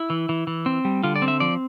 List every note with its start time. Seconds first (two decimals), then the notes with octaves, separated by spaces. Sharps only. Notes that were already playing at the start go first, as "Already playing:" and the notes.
Already playing: E4
0.10 E3
0.29 E3
0.47 E3
0.66 C4
0.85 G3
1.03 D3 F4
1.16 D5
1.22 C4
1.28 E5
1.40 F3 D5